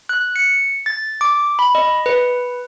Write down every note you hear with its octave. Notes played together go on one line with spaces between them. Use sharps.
F#6
C#7
A6
D6
B5
D#5
B4